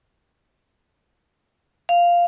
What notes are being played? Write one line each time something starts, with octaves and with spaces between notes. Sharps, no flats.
F5